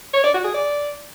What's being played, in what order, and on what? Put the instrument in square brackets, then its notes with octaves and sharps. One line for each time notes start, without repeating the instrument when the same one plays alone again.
[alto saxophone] C#5
D5
F#4
G#4
D5